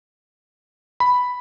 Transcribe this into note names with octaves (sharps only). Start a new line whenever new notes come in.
B5